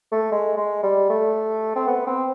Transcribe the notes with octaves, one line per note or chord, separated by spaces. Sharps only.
A3
G#3
G#3
G3
A3
C4
B3
C4